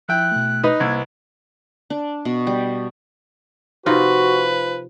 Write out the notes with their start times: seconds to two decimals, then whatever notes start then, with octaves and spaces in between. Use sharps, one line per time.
0.09 F3 E4 G5 F#6
0.32 B2 A3
0.64 D#4 B4 D#5
0.80 C2 A#3 E6 G#6
1.90 D4
2.25 B2
2.47 G3
3.86 C3 F3 D#4 F4 F#4 B4